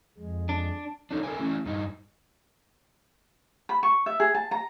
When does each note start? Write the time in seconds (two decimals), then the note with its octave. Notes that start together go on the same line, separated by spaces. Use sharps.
0.18 F2 G#3
0.49 D4
1.11 D4 D#4 A4 C#5
1.23 A4 A#4 C5 E5 G#5
1.39 A3 C#4 E4
1.66 G2 D#4
3.69 B5
3.83 C#6
4.06 E5
4.20 G#4
4.35 A5
4.51 A#5